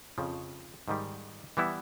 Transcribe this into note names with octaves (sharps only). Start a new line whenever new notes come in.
F2 C#3 F3
G#2 D#3 G3
E3 G3 B3 E4